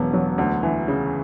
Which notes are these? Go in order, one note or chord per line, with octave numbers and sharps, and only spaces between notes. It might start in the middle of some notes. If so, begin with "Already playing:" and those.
Already playing: E1 F#3 B3
F#3
D2
E3
C#3